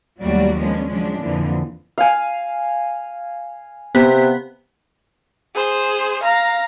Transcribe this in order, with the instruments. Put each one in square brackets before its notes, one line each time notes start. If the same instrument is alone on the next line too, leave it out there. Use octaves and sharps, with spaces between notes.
[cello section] D#2 F#3 G3 A3 F#4 D5
F3 G#3 B3 C#4 D4
C#3 F3 F#3 G#3 C#4 D4
F2 A#2 D3 E3 F3
[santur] F5 G#5
[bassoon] C3 [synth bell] B3
[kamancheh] G#4 C5
F5 A#5